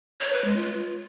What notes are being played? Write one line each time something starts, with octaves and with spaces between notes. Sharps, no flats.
C#5
B4
G#3
F4